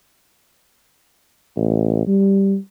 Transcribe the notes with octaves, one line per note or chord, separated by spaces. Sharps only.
A1
G3